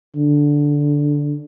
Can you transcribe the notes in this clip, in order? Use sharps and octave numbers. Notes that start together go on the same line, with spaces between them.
D3